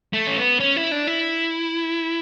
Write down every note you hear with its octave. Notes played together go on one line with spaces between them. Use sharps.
A3
C#4
B3
C#4
E4
D4
E4